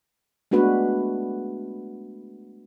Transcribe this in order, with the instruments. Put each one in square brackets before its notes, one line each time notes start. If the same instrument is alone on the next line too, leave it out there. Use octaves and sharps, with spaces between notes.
[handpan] G#3 A3 B3 D4 F#4 B4